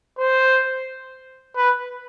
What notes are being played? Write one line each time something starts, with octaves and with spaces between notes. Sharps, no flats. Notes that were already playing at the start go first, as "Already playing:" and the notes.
C5
B4